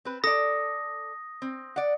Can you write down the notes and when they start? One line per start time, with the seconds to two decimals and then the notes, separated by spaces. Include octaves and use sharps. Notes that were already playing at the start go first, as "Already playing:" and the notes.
0.05 C4 B4
0.24 A4 D5 D#6 A#6
1.42 C4
1.76 D5 F#5